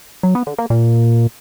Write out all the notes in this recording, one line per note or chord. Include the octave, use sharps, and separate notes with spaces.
F#3
B3
D3
A#3
A#2